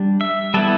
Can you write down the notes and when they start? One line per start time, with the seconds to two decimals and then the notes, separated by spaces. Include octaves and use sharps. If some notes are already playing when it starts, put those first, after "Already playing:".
Already playing: G3 D4
0.21 E5
0.54 G3 B3 E4 A4